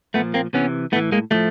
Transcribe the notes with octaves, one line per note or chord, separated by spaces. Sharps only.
A#2 F3 A3 B3
A#3 C4
C3 E3 B3 C#4
A2 E3 A3 B3
G#3 A#3
A2 F3 G3 A3